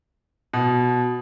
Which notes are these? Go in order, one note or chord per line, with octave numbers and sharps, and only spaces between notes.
B2